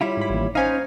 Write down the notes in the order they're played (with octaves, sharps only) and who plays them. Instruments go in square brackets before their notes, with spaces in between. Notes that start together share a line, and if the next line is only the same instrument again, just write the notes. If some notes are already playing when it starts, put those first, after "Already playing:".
[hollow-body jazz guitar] G3 E4 F4 [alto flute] C#5
[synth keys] G#2 B5
A1 D#2
[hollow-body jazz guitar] C#4 D#4 [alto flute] C5 [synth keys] F5 G#5